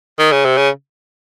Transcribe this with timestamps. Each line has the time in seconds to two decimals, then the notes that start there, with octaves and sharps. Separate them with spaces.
0.19 D#3
0.32 C#3
0.45 C3
0.58 C#3